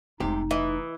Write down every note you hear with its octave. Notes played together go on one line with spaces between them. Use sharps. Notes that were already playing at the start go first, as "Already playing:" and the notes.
F1 G#2 C3 D#4 E4 G4
E3 D#5